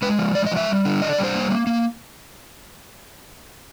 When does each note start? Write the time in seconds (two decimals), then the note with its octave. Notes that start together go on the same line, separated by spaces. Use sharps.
0.02 G#3 B4
0.19 F3
0.35 G#3 D5
0.46 D#5
0.51 F3
0.57 E5
0.69 G3
0.85 D3
1.02 D4 D#5
1.13 D5
1.18 G3
1.24 C5
1.35 A#3
1.50 A#3
1.67 A#3